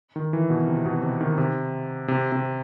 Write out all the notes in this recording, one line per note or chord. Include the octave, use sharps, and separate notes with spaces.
D#3
E3
B2
C3
B2
C3
D#3
C3
C3
C3